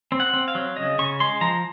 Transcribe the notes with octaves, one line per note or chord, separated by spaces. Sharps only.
C4
F#5
C4
F5
F#3
C#3 D#5
C#3 C#6
G#3 C6
F3 A#5